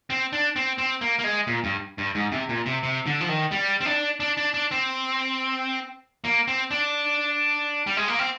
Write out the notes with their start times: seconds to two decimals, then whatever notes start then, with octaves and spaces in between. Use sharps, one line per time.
0.10 C4
0.33 D4
0.56 C4
0.78 C4
1.01 A#3
1.19 A#3
1.24 G#3
1.47 A#2
1.64 G2
1.98 G2
2.15 G#2
2.32 C3
2.49 A#2
2.66 C3
2.83 C3
3.06 D3
3.21 F3
3.29 D#3
3.52 G3
3.81 C4
3.86 D4
4.20 D4
4.37 D4
4.54 D4
4.71 C4
6.24 A#3
6.48 C4
6.71 D4
7.87 G3
7.97 G#3
8.08 A#3
8.19 C4